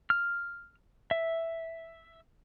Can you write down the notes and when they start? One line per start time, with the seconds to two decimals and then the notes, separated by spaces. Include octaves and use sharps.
0.10 F6
1.11 E5